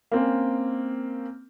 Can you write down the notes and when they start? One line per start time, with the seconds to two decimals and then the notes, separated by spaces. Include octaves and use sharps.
0.12 A#3 C4 C#4